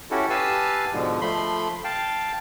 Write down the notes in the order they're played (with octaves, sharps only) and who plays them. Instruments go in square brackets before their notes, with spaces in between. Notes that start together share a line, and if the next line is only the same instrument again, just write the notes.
[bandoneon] C#4 E4 F#4 G4 A4
G4 B4 F5 G#5 A5 E6
G#2 B2 D3 F3
F3 A3 B5 C6
F5 G5 A5